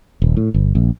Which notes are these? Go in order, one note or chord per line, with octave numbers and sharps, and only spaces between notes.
D#1
A2
G1
A#1